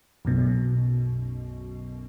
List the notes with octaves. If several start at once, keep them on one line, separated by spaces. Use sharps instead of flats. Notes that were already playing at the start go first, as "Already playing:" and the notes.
B1 F#2 B2